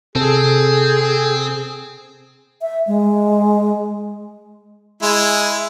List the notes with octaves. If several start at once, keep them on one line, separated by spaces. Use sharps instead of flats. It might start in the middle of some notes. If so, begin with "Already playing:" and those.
C3 C4 G#4 A4
E5
G#3
G#3 E4